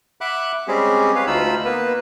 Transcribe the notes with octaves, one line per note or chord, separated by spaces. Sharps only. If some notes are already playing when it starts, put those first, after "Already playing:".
E5 F#5 B5 D6 F#6
G3 G#3 C4 C#4 G4 G#4
B4 C#5 F5
D2 D#4 F4 B5 E6
A#3 B3 B4